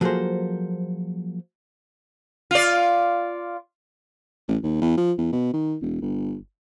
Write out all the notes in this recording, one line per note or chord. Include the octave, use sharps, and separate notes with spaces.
F3 F#3 A#3 G#4 A4 C5
F4 D5
A1
D#2
E2
F3
E2
B2
D#3
E1
G1